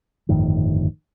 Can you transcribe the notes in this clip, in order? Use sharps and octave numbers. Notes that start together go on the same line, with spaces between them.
G1 F2 A2 D#3